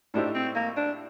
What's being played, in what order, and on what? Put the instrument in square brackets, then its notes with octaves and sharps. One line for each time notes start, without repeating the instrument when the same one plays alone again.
[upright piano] A2 A3 D#4 G4 C5 [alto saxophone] D4
[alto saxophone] C4
A#3
D4